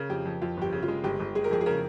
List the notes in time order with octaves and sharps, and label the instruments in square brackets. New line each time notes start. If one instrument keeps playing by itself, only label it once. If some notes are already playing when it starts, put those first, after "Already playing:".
Already playing: [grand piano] C#3 [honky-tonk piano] A#4
[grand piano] F2 [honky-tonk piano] G4
[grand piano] F2
[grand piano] F2 [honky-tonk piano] F4
[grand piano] G1 [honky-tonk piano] G4
[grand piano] C#3
[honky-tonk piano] F4
[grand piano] G#3
[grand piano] G1 [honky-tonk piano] G4
[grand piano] G1
[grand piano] G#3 [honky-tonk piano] G#4
[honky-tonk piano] A#4
[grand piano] F2 [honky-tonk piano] G#4
[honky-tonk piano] G#4
[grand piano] C#3 [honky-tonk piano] A#4